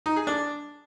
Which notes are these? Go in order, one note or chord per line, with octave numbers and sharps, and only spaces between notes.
D#4
G#4
D4